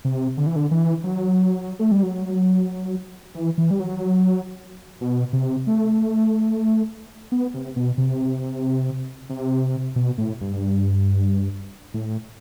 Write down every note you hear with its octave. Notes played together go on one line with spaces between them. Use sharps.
C3
D3
E3
D3
E3
F#3
A3
G3
F#3
E3
E3
G3
F#3
B2
C3
A3
B3
C3
B2
C3
C3
B2
A2
G2
A2